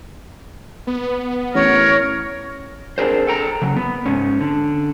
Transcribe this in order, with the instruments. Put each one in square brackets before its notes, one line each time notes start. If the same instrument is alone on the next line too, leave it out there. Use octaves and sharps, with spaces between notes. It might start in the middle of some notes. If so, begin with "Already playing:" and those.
[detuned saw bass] B3
[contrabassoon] A1 [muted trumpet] A#4 [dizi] C#5
[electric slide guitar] C4 D4 G#4 A#4 C5
A4 G5 A#5
C#3 F#3
B3
G#2 C#4
D3